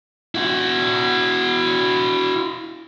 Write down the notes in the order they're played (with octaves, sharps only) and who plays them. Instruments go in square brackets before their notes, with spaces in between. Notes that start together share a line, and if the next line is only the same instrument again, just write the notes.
[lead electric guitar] E4 F#4